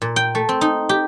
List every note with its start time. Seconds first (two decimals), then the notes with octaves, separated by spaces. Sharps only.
0.02 A#2
0.16 G5
0.35 A3
0.49 C4
0.61 D#4
0.89 G4